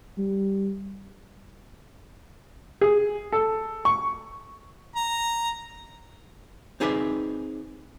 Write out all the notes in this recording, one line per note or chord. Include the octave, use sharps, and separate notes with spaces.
G3
G#4
A4
C#6
A#5
C4 D#4 G#4 B4 D5 E5